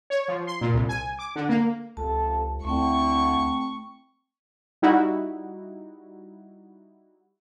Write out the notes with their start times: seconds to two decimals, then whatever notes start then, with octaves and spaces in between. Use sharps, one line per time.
0.10 C#5
0.28 F3
0.47 C6
0.61 A#2
0.74 C2
0.89 G#5
1.19 D6
1.36 D3
1.49 A#3
1.97 C#2 C3 F3 A4 A5
2.65 D2 D3 A3 C4 E4 G5 C#6
4.82 G3 D#4 E4 F#4